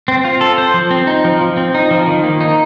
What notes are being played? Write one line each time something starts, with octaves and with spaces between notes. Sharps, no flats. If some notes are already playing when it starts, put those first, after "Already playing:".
C4
F4
A4
C5
F3
C4
D#4
F3
F3
C4
D#4
F3
D#3
A#3
D#4